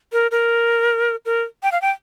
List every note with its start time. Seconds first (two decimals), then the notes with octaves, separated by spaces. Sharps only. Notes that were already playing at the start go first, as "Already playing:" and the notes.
0.12 A#4
0.31 A#4
1.25 A#4
1.63 G5
1.72 F5
1.82 G5